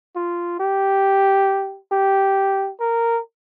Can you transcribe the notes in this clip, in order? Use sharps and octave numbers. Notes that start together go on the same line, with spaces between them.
F4
G4
G4
A#4